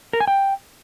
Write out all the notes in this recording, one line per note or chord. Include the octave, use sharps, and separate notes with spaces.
A#4
G#5
G5